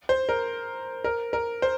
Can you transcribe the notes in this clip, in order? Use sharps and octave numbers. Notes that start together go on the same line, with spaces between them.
C5
A#4
A#4
A#4
C5